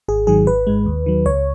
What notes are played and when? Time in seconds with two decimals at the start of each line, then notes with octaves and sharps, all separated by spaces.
0.08 G#1 G#4
0.27 G#2 D#3 F#3 G#4
0.47 G#1 B4
0.67 G#2 G#3
0.86 D#2
1.06 D#3 F#3
1.26 C#2 C#5